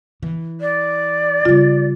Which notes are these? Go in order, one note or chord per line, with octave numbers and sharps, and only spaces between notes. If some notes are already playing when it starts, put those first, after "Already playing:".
E3
D5
C#3 G3 F4